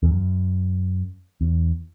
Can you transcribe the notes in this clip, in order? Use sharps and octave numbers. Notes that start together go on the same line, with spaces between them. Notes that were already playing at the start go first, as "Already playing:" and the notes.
E2
F#2
E2